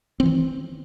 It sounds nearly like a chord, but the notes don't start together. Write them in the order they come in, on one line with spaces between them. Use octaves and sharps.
C4 E3 D#3